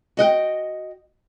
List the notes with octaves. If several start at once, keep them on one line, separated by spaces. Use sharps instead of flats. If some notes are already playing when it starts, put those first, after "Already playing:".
F#4 D#5 F#5 G5